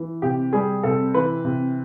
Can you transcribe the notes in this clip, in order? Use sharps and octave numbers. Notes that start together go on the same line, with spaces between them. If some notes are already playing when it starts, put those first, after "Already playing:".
Already playing: E3
C3 G4
G3 G#4
C3 A4
E3 B4
C3